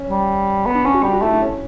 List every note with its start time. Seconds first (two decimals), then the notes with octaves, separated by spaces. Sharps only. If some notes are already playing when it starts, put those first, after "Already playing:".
Already playing: C#4
0.10 G3
0.66 B3
0.75 D4
0.85 C#4 D4
0.94 F#4
1.03 G3 G4
1.13 F#4
1.22 A3 E4
1.32 D4
1.41 C#4